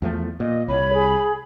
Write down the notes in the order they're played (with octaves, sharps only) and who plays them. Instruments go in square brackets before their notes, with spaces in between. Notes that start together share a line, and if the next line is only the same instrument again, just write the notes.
[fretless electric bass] E2 F3 A3
[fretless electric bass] A#2 [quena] D#5
[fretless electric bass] C2 [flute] C#5 [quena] B5
[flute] G#4